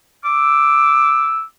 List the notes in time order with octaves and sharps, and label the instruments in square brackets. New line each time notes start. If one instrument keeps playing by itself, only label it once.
[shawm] D6 [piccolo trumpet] E6